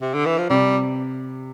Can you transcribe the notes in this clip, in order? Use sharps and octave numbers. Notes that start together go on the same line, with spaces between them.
C3
D3
E3
F3
C3 G3